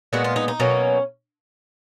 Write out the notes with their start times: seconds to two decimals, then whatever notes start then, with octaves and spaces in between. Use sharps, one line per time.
0.13 A#2 G#3 B3 F#4
0.24 F4
0.36 D#4
0.48 D#4
0.60 B2 F#3 A#3 C#4